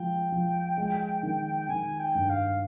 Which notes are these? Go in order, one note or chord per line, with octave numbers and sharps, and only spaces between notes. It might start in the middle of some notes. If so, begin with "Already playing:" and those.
Already playing: F3 G#3 G5
F3
G#3
D#3
G5
D#3 G#5
G5
G2
F5